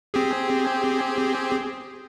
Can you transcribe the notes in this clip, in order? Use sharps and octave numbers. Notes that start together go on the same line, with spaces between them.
C4 G4 G#4